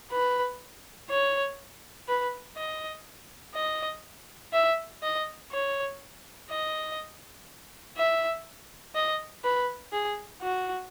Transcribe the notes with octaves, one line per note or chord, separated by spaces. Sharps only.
B4
C#5
B4
D#5
D#5
E5
D#5
C#5
D#5
E5
D#5
B4
G#4
F#4